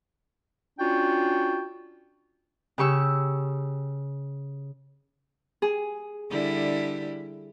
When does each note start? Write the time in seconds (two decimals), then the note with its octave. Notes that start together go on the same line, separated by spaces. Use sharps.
0.79 C#4 D4 F4 F#4 G5
2.78 C#3 G4 C#6 E6
5.62 G#4
6.31 D3 G3 E4